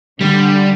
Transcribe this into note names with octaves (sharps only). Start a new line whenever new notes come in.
D3 G3 D4